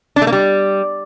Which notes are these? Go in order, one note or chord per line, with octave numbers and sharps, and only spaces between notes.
D4
A3
A#3
G3